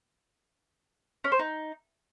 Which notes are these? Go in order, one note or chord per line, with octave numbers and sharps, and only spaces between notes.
C#4
C5
D#4